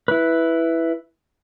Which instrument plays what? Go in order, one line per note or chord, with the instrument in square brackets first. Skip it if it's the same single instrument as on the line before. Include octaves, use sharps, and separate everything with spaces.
[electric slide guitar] E4 B4